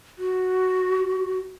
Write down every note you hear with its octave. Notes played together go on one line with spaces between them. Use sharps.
F#4